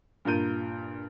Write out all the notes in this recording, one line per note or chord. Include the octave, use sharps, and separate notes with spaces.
G2 A#2 F4 A#4 G6 D#7